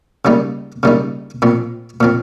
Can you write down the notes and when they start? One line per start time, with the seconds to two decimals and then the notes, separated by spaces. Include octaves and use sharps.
0.25 C#3 G3 A#3 D#4
0.83 C#3 G3 A#3 D#4
1.42 A#2 F3 C4
2.01 A#2 F3 C4